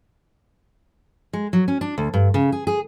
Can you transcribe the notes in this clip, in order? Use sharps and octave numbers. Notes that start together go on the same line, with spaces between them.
G#3
F#3
C#4
D4
D2
G2
C#3
G#4
G#4